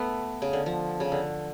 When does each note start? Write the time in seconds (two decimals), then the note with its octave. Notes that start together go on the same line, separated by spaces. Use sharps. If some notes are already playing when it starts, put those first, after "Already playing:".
Already playing: A3 B3
0.42 C#3
0.53 D3
0.66 F3
1.00 C#3
1.12 D3